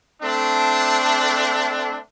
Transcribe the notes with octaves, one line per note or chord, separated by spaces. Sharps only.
A3 C4 D4